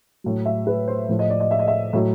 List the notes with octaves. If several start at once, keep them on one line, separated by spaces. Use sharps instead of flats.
A2 F#3
E5
B4
C5
A2 F3
D#5
D5
D#5
E5
D#5
E5
A2 F#3